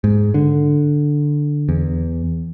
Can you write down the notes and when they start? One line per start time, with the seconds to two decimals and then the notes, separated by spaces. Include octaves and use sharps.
0.04 G#2
0.34 D3
1.69 E2